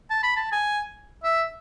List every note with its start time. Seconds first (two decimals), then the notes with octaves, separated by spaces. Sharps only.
0.10 A5
0.23 B5
0.36 A5
0.52 G#5
1.24 E5